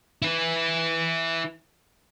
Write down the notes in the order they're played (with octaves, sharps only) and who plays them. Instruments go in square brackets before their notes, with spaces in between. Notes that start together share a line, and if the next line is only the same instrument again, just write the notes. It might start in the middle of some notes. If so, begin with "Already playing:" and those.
[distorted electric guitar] E4 B4